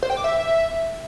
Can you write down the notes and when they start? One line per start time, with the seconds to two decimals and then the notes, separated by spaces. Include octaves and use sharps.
0.03 C5
0.10 G5
0.17 D6
0.24 E5